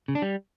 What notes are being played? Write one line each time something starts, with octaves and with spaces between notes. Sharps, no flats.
C#3
D4
G3